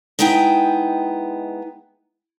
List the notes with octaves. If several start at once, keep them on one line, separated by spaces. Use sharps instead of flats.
G#3 B3 D#4 E4 G5